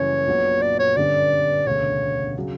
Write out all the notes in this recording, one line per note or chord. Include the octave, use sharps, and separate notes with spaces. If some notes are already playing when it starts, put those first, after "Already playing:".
Already playing: F#1 F#2 E3 G3 C#4 C#5
A#1 A#2 F#3 B3 F#4
D5
C#5
G1 G2 D3 G3 C#4 D5
E1 D2 C#3 C#5
C#3 F#3